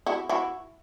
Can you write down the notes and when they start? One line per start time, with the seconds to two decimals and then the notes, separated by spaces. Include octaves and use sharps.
0.06 E4 F#4
0.29 E4 F#4